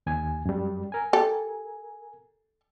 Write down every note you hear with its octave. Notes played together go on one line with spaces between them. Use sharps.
D#2 G#5
F#2 G3
A#4 G#5
G4 A4